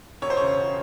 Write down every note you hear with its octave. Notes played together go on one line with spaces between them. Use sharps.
E1 C#5
C5
C#3 C#5
E1